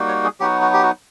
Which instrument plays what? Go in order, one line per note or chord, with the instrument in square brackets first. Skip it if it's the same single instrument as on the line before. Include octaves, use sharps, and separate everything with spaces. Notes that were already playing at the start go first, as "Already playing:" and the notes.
Already playing: [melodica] G3 A#3 D#4 F#4
C#5
G#4
F#3 B3 D#4 F#4 G4
F#4
G4
F#4